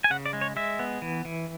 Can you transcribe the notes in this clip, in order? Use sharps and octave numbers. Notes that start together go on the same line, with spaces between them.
G#5
C#3 F#5
D5
G#3
C#5
G#3 E5
B3
E3
E3